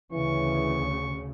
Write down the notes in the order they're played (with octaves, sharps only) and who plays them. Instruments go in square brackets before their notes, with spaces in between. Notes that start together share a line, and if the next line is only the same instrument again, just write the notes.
[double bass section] D2 C#3 [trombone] E3 [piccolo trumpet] C#6